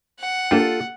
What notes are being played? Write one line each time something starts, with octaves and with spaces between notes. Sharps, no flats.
F#5
A#3 D4 F4 G4 A4